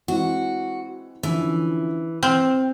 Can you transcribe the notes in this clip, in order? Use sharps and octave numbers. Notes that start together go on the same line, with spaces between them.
E3 G#3 C4 F#4
D3 E3 F3 C#4
C4 F6